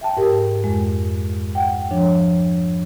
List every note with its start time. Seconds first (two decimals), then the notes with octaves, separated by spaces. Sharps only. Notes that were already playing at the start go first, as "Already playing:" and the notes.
0.01 E5 G5 A5
0.17 G#2 G4 A#4
0.64 F2 G#3
1.55 F#5 G5
1.91 F3 D4 C#5